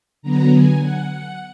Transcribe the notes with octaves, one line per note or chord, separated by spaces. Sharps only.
D3 F#3 B3 A#5
G#5
F#5
F#5